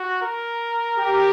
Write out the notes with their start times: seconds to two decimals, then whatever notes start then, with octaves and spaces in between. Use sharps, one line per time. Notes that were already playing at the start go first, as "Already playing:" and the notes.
Already playing: F#4
0.22 A#4
0.98 G4